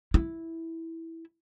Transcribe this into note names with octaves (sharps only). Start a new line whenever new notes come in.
E4